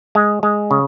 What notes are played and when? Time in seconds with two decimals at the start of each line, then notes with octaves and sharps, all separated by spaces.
0.15 G#3
0.43 G#3
0.71 C#3